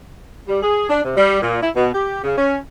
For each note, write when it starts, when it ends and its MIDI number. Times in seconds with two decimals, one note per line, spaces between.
0.48 0.61 55
0.63 0.89 68
0.90 1.01 62
1.04 1.16 48
1.17 1.42 55
1.42 1.60 46
1.62 1.71 64
1.76 1.90 47
1.94 2.19 67
2.23 2.35 49
2.37 2.57 61